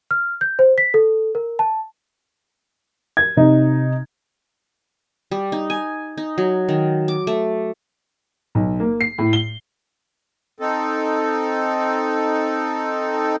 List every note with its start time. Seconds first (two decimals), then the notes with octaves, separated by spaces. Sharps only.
0.11 F6
0.41 G6
0.59 C5
0.78 B6
0.94 A4
1.35 A#4
1.59 A5
3.17 G#6
3.37 C3 D#4
5.31 G3
5.52 D#4
5.70 G#5
6.17 D#4
6.38 F#3
6.69 D#3
7.08 D6
7.27 A3
8.55 B1
8.80 A#3
9.01 C7
9.18 A2
9.33 G7
10.59 C4 D#4 A4